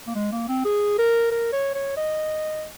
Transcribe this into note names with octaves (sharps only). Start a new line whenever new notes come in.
A#3
G#3
A#3
C4
G#4
A#4
A#4
C#5
C#5
D#5